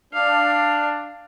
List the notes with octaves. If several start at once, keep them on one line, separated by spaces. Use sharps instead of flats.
D4 F5